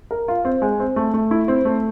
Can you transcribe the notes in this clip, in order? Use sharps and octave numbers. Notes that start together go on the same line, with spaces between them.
A#4
F4
C4
G#3
C4
A3
A3
E4
C4
A3